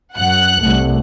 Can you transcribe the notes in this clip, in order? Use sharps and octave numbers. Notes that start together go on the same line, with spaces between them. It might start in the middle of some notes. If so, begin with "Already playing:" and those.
F#2 F#5 F#6
C2 A3